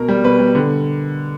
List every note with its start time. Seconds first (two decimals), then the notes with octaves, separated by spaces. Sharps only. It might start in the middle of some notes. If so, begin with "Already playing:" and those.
Already playing: B2 A#4
0.08 G3
0.24 B2 B4
0.39 G3
0.55 D3